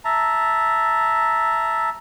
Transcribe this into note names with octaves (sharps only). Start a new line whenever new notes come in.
E5 A5 A#5